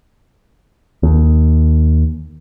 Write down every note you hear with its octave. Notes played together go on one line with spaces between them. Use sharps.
D#2